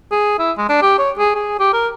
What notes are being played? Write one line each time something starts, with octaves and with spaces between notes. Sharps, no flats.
G#4
E4
G#3
D4
G4
C#5
G#4
G#4
G4
A#4